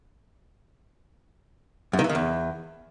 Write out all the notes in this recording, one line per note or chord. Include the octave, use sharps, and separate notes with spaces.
F#2
D#3
E3
D#3
E2